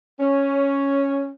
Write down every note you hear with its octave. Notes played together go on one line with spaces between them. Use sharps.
C#4